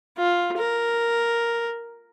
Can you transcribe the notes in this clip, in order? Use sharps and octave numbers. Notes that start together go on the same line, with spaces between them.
F4
A#4